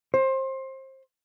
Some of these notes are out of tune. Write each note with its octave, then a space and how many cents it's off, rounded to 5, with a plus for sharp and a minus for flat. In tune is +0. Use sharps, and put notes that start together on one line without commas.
C5 +25